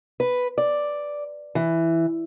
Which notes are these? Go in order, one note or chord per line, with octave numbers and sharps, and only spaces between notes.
B4
D5
E3